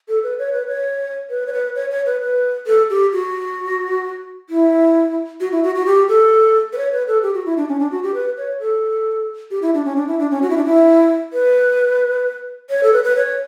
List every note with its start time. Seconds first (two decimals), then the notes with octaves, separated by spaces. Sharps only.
0.09 A4
0.23 B4
0.39 C#5
0.53 B4
0.67 C#5
1.30 B4
1.47 C#5
1.53 B4
1.75 C#5
1.91 C#5
2.06 B4
2.21 B4
2.67 A4
2.90 G4
3.13 F#4
4.50 E4
5.40 F#4
5.52 E4
5.64 F#4
5.75 F#4
5.86 G4
6.09 A4
6.73 B4
6.78 C#5
6.93 B4
7.08 A4
7.23 G4
7.34 F#4
7.46 E4
7.57 D4
7.69 C#4
7.80 D4
7.91 F#4
8.03 G4
8.14 B4
8.37 C#5
8.60 A4
9.51 G4
9.62 E4
9.74 D4
9.85 C#4
9.96 D4
10.07 E4
10.19 D4
10.31 C#4
10.42 F#4
10.50 E4
10.57 D4
10.65 E4
11.33 B4
12.70 C#5
12.83 A4
12.93 B4
13.04 B4
13.16 C#5